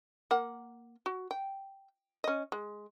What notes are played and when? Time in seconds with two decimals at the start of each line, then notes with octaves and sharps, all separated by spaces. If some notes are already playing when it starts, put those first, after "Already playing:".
0.31 A#3 F#5
1.06 F#4
1.31 G5
2.24 C#4 D#5
2.52 G#3